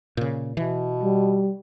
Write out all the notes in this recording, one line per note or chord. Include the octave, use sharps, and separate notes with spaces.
A#2 C#3
B2 E3
G3